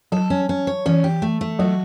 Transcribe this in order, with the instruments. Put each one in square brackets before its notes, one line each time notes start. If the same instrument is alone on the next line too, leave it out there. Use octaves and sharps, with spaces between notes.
[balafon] F#3 [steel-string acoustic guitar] A4
[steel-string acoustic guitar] C#4
C#4
C#5
[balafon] E3 [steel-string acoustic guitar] C#4
[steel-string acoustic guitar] G4
A3
A3
[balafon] F#3 [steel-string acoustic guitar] F#4